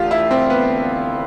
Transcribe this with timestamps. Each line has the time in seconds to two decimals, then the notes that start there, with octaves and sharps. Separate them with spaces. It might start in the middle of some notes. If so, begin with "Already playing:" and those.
Already playing: E1 D2 D3 F4 G4
0.11 E4
0.31 C4
0.50 B3